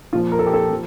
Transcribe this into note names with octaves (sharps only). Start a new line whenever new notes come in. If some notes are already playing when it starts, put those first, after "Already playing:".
A#2 F3 F4
A#4
A4
G4
A4
F3